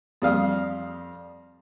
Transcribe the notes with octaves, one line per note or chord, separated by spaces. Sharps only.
F2 G3 F5 D#6